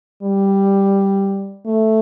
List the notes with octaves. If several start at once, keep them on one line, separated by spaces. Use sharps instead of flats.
G3
A3